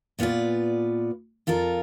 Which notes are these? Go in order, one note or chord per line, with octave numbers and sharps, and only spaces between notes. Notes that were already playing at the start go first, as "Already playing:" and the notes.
A#2 B3 F4 B4 D5
F2 F4 A4 A#4